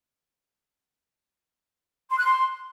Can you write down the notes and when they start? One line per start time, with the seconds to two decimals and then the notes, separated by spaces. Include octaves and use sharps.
2.11 C6
2.18 F#6
2.25 C6